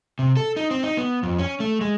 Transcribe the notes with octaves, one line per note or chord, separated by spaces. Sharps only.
C3
A4
D#4
C4
D#4
B3
F2
C#4
A3
G#3